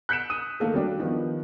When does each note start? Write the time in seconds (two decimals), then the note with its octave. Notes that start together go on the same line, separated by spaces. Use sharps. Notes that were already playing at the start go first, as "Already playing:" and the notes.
0.09 F#6 G6 B6 C#7 D7 E7
0.30 D#6 D#7
0.60 D#3 A3 A#3 A4
0.74 F#3 G3 D4
1.00 D#3 F3 B3